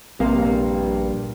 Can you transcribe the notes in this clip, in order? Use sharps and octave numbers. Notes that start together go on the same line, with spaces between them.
A#1 G2 C3 A#3 F5